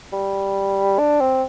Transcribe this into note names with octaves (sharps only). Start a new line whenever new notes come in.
G3
D4
C4